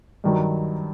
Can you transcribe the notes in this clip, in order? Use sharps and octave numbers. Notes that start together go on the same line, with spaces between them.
G2 D#3 F#3